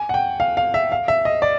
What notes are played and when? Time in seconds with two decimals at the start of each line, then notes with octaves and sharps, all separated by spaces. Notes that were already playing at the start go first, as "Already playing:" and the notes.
Already playing: G#5
0.09 F#5
0.14 G5
0.40 F5
0.57 F5
0.74 E5
0.92 F5
1.08 E5
1.25 D#5
1.42 D5